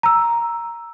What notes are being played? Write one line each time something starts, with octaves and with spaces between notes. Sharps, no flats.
A#5 E6